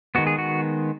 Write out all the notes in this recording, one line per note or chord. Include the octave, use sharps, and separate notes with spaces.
D#3 G#3 B3 F#4
G#4
F#4